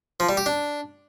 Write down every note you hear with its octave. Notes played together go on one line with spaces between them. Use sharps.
F3
G3
G4
D4